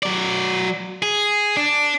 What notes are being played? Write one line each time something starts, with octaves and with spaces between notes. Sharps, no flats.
F#3 D5
G#4
D4